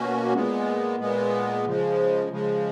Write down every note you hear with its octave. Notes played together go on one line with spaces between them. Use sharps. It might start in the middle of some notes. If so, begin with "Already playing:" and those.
Already playing: B2 A#3 C#4 F#4
A#2 G#3 B3
A#2 G#3 B3
C#3 F3 G#3
C#3 F3 G#3